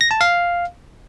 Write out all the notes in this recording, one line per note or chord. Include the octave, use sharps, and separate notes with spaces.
A#6
A5
F5